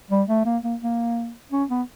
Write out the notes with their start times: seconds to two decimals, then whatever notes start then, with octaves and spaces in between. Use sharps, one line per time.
0.11 G3
0.28 A3
0.45 A#3
0.63 A#3
0.82 A#3
1.52 C#4
1.70 B3